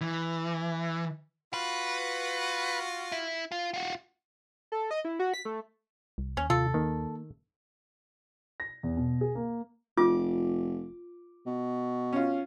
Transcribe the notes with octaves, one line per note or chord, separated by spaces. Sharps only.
E3
F4 F#4 B4
E4
F4
F4 F#4
A4
D#5
E4
F#4
B6
A3
C2
D#2 C#4
C3 F4 A4
D#3 A#3
A#6
E2
B2
G#4
A#3
F1 F4 D6
B2
C#4 F4